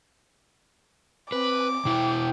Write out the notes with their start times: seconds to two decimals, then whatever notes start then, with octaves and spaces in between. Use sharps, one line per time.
1.32 C4 B4 D6
1.85 B2 E4 G5